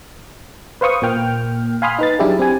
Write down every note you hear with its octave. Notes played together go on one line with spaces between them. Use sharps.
B4 C5 F5 C#6 D#6
A#2 A#3 G5 F6
F5 G#5 B5 C6 D#6 F6
D#4 B4 A6
F#3 D4 E4 G4 G#4
C4 G4 G#5